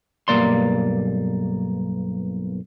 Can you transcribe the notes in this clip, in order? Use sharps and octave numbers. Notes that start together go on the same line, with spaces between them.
B1 G2 C#3 A#3 D5 C6